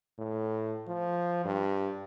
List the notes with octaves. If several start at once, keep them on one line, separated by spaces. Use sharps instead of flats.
A2
F3
G2